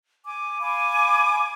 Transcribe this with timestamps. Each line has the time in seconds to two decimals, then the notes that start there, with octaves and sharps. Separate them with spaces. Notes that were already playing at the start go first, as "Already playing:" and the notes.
0.24 G#5 D6
0.60 F5 G#5 B5 D6